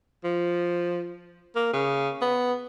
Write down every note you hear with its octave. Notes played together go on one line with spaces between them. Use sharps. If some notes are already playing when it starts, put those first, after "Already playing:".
F3
A#3
C#3
B3